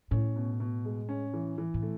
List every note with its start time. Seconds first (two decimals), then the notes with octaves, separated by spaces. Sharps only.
0.11 A2 C#4
0.36 B2
0.60 B2
0.85 G#3
1.09 C#4
1.33 E3
1.58 E3
1.74 A2
1.82 A3